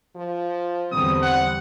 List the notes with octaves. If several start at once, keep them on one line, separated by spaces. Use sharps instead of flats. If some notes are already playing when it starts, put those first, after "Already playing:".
F3
E2 D3 G3 C4 D#6
F#5